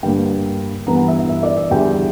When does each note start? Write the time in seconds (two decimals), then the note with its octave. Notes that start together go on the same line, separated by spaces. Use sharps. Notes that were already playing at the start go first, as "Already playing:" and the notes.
0.03 G2 D3 A#3 G5
0.87 G2 E3 B3 A#5
0.97 F#5
1.08 E5
1.19 E5
1.29 E5
1.43 D5
1.57 E5
1.71 E2 D3 G3 G5